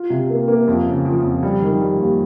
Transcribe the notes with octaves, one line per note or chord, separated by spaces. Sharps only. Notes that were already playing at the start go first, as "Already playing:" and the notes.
Already playing: F4
C3
A#3
A#3
F2
C#3
F3
F2
G3
D#3
G3
D#2